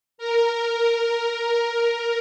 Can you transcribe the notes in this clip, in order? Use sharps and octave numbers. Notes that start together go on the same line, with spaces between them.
A#4